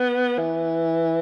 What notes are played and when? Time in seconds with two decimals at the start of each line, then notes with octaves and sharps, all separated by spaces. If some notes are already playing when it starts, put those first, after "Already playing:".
Already playing: B3
0.38 E3